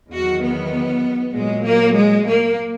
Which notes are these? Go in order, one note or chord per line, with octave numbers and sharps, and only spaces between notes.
E2 D#3 F#3 F#4
B3
A#2 F#3 G#3
A#3
G#3
A#3